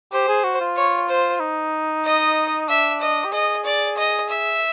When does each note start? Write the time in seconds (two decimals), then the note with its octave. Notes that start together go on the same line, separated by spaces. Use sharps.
0.12 G4 C5
0.28 G#4
0.44 F#4
0.60 F4
0.76 C#5
1.09 C5
1.40 D#4
2.05 D#5
2.69 D4 E5
3.01 D#5
3.25 G4
3.33 G#4 D#5
3.65 D5
3.97 D#5
4.29 E5